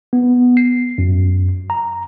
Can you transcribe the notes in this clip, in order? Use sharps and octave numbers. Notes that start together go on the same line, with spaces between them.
B3
C7
F#2
A#5